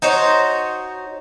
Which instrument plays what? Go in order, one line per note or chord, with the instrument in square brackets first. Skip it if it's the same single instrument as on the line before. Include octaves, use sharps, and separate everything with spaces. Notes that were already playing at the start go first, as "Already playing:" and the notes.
[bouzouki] D#4 F#4 C5 C#5